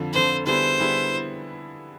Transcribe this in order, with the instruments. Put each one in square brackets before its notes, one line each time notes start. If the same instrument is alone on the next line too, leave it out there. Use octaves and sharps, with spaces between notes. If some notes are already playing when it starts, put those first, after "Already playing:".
Already playing: [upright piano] F2 D3 F3
[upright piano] F2 D3 F3 [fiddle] C5
[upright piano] D3 G3 B3 E4 G#4 [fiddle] C5
[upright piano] D3 G3 B3 E4 G#4